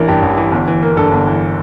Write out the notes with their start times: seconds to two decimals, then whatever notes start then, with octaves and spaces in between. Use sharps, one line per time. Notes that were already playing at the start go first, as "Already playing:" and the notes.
Already playing: A1 E3 A#3 D4 E4
0.08 G2 G4
0.22 A1
0.37 E3
0.52 G1
0.67 E3
0.83 A#3
0.97 G2 A4
1.11 G1
1.27 E3